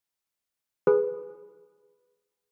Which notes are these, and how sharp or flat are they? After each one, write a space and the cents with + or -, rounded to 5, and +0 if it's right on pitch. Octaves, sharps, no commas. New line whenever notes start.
G#4 +0 B4 +0